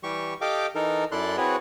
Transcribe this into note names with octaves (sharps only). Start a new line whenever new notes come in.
E3 G3 G4 C#6
G4 A4 D#5 F5 G5 D6
E3 D#4 A4 A#4
F#2 E4 A4 D5 C6 F#6
C4 E4 F#4 G#4 B4 C#5